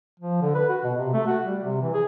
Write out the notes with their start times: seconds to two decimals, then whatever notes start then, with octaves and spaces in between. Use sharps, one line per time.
0.19 F3
0.41 D3
0.54 B4
0.69 F#4
0.84 B2
0.97 C3
1.13 A3
1.26 F#4
1.44 G3
1.64 C3
1.82 E3
1.94 G#4